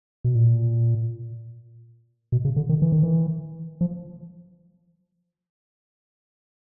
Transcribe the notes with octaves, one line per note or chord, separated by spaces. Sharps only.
B2
A#2
B2
C#3
D3
D#3
E3
D#3
E3
F3